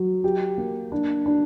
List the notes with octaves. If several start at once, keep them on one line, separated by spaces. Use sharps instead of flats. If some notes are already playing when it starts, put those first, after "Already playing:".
Already playing: F#3
G4
A#3
D4
D4